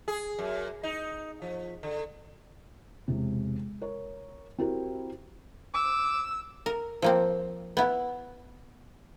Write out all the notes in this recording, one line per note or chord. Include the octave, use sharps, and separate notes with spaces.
G#4
F#2
D#4
F3
D3
E1 C3
A#4 C#5
C4 E4 F#4 G4 A#4
D6 E6
A#4
F3 A#3 C4
B3 E4